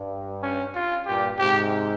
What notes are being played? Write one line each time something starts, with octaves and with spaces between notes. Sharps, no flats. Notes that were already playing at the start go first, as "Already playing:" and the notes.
Already playing: G2
C#4
F4
G2 A#2 G4
G#2 C3 G4